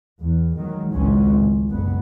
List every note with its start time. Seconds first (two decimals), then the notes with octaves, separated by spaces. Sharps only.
0.20 E2
0.58 D#3 F#3 G#3
0.93 G#1 C#2 A2 F#3 C4 C#4
1.34 A2
1.70 F#1 B1 B3